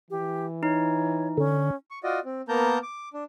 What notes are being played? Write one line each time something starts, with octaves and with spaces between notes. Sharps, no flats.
E3 G4
D#4 C#5
D3 C#4
C#6
F4 F#4 D5 D#5
C4
A#3 B3 A#4 A5 A#5 G6
D6
D4